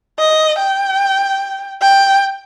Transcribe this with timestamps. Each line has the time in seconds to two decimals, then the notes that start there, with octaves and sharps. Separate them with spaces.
0.19 D#5
0.59 G5
1.82 G5